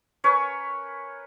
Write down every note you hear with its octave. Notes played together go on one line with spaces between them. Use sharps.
C#4 A#4 B4 C#5